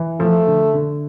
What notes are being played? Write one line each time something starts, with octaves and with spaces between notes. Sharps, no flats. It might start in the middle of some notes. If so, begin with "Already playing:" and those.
Already playing: E3
F3 A3
D3
D3